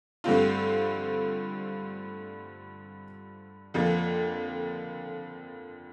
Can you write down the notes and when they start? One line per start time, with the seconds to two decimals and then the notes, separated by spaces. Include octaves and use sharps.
0.24 G2 D3 A3 C4 F4
3.74 F2 D3 F3 A#3